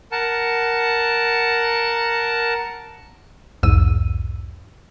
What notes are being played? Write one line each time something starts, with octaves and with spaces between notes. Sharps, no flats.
A#4 F#5 A5
B1 E2 G#2 E6 D#7